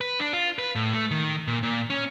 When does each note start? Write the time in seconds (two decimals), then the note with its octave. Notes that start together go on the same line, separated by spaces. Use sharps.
0.01 B4
0.20 D4
0.33 F4
0.58 B4
0.75 A2
0.93 A3
1.11 D#3
1.47 A#2
1.63 A#2
1.90 C#4